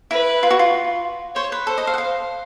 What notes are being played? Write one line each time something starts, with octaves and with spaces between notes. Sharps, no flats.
E4 B4
F4
F#4
F4
C5 C#5
B4
A4 C5
D#5
F5
F#5
F5